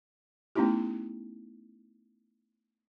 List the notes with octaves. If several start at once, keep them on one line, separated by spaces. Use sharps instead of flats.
A3 B3 C#4 D#4 E4 G4